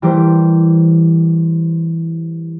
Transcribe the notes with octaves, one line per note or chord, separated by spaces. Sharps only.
E3 G3 A3 G4 A#4 C5